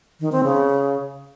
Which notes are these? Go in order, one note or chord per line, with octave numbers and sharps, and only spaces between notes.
D#3
C4
C#3